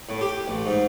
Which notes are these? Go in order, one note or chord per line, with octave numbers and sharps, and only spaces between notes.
A2
G4
A1
G#2